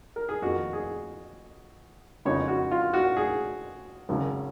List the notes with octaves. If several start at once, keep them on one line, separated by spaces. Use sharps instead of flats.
A#4
G#4
F2 D#3 A#3 F#4
G#4
F2 C#3 G#3 B3 D#4 C#5
F#4
F4
F#4
G#4
G#1 F#2 C#3 G#3